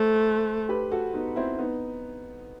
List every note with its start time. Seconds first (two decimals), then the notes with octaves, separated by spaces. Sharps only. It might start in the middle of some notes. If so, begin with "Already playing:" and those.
Already playing: A3 A4 C5
0.69 G4 B4
0.92 F#4 A4
1.13 B3 D#4
1.36 C4 E4
1.59 B3 D#4